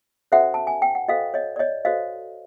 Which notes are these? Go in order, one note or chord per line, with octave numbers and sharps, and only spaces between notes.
C#4 F#4 A4 C5 E5 F#5
A5
G#5
G5
F#5
F#4 A4 C5 D#5 F5
C#5 D#5
D5
C#5 D#5
F#4 A4 C5 D#5 F5